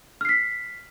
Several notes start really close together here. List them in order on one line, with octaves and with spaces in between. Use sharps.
F6 C7 B6